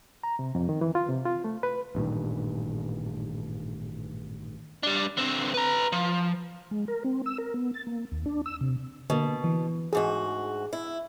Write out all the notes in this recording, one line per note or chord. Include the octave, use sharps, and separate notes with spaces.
A#5
C3
F2
D#3
E3
F4
C3
F4
A3
B4
A1 G2 A#2 D#3
G3 D4
D3 C4
B4 A#5
F3
G#3
A#4
C4
E6
A#4
B3
A6
A#3
D#2
D4
E6
C3
B2 D3 A#3
E3
D2 G#2 F#4 G#4
E4